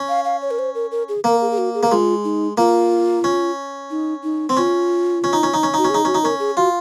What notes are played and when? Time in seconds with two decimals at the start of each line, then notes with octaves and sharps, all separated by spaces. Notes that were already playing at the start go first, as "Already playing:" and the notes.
Already playing: C#4
0.09 F5
0.25 F5
0.42 C#5
0.51 A#4
0.59 C5
0.75 A#4
0.92 A#4
1.09 G#4
1.24 A#3 A#4
1.41 G#4
1.51 G#4
1.58 F#4
1.74 G#4
1.83 A#3
1.92 G#3 F4
2.24 D#4
2.58 A#3 F4
3.24 C#4
3.90 D#4
4.23 D#4
4.49 C4
4.57 C#4 F4
5.24 C#4
5.33 D#4
5.43 C#4
5.54 D#4
5.63 C#4
5.74 D#4 F#4
5.85 C#4
5.90 D#4 G#4
6.05 C#4 F#4
6.15 D#4
6.23 C#4 A#4
6.39 G#4
6.57 F4 F#4